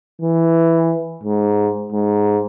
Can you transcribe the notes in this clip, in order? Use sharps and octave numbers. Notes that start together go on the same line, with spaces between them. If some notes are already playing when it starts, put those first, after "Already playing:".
E3
G#2
G#2